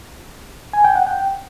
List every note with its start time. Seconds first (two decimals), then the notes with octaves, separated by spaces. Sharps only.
0.73 G#5
0.85 G5
0.96 F#5
1.07 G5